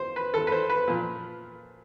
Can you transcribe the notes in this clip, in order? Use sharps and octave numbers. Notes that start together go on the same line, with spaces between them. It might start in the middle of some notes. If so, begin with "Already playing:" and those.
Already playing: C5
B4
A4
B4
C5
B4
A#2 F3